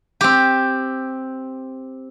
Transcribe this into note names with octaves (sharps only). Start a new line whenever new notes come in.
C4 G4